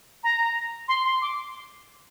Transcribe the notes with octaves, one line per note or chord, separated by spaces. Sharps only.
A#5
C6
C6
D6